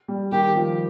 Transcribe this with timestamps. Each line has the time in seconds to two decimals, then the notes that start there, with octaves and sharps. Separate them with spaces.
0.08 G3
0.32 D#3 G4
0.55 F3